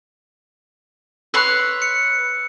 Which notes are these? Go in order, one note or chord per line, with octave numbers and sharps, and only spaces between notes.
B4 C#5 C6 E6 F#6
C#7